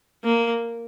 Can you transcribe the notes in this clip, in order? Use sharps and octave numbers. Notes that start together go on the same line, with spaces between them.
A#3